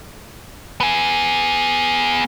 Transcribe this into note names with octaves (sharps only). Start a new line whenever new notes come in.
B3 G#4